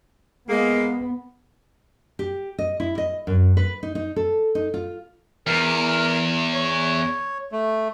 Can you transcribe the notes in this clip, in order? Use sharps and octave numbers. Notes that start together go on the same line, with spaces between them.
G#3 A#3 B3
G4
D#5
E4
D#5
F#2
B4
D#4
D#4
A4
D#4
F4
E2 A#4 F6
C#5
A3